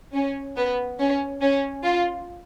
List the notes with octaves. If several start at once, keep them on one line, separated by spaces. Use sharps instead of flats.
C#4
B3
C#4
C#4
F4